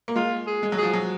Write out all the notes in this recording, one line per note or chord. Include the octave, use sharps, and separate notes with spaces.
A#3
G#3 F4
G#4
G#3
F#3
F3 G#4
F#3